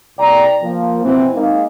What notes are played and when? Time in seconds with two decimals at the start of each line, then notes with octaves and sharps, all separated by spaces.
0.19 C2 D5 G5 A#5
0.63 F3 A#3
1.05 B2 E3 C4
1.36 G#3 A#3 D#4